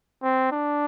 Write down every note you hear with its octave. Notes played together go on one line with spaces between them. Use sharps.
C4
D4